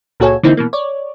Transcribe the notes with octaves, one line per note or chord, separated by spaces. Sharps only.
C#2 A#2 F#4 A4 C#5 G#5
D3 E3 A#3 C4 D#4 E4
B2 E3 A#3
C#5 D5